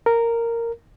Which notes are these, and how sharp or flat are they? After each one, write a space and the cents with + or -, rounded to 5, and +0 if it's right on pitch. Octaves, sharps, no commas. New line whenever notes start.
A#4 -10